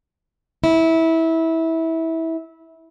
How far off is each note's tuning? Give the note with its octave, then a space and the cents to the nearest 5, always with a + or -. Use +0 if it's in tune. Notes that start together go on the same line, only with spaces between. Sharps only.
E4 -20